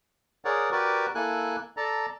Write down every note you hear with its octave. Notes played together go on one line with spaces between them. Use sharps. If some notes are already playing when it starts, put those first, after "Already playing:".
G#4 A#4 C#5 D5 F#5
F#4 G4 A#4 B4 D5
A#3 E4 A4 G#5 F#6
A4 D5 A5 A#5